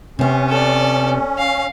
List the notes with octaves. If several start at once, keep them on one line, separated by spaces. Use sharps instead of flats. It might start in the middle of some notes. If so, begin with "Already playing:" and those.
C3 B3 C#4
A4 D5
F5